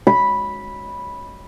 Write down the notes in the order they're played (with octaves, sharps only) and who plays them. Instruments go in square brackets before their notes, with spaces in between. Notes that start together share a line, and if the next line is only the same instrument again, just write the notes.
[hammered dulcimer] B5